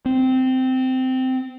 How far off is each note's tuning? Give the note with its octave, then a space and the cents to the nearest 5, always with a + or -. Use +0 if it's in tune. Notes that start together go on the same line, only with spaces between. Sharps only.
C4 -15